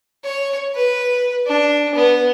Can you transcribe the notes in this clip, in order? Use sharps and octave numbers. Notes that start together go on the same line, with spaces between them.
C#5
B4
D4
B3